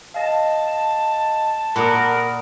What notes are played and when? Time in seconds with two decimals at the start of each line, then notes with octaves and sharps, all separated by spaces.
0.14 D#5 F5 A5
1.76 A#2 A#4 F#5 B5 D#6